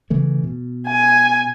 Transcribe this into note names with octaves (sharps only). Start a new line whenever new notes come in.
C#3 E3 A3
B2
G#5